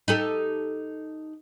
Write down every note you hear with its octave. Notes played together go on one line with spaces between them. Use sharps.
D#4 G4 A4